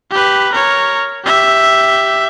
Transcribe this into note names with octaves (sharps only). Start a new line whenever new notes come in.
G4 B4
A#4 C#5
G4 E5